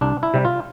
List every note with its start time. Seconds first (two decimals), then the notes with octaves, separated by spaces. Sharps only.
0.01 C2 D4
0.23 E4
0.34 C3 G3
0.45 F4